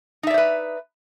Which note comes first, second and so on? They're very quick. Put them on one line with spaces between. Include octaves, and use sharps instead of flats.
D#4 E5 D5 C5 B4